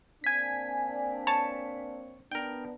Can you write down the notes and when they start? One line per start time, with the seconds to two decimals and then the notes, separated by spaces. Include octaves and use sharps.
0.24 A#3 C4 D4 G#5 B6
1.27 C#5 A5
2.32 B3 D4 A#4 G5